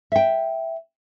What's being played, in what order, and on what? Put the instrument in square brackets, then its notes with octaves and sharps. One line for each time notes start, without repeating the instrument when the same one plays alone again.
[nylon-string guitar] E5 G5